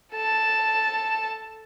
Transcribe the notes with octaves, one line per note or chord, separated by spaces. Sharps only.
A4 A5